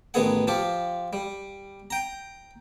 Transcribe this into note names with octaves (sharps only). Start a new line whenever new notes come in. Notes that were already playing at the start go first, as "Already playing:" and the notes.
A1 D#3 B3 G#4 F#5
F3 F4 G4
G3
G5 A#5